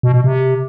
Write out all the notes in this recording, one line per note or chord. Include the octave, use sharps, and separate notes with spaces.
B2
B2
C3